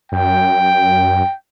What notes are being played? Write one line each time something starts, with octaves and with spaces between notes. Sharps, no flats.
F#2 G5